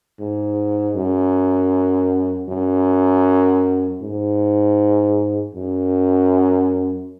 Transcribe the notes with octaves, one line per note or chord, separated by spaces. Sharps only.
G#2
F#2
F#2
G#2
F#2